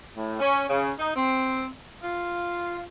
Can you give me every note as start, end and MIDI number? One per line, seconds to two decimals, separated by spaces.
0.16 0.39 45
0.40 0.65 61
0.70 0.92 49
0.99 1.10 63
1.16 1.69 60
2.03 2.85 65